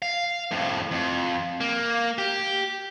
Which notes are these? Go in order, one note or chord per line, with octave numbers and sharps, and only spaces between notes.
F5
F2 A2
F2
A#3
G4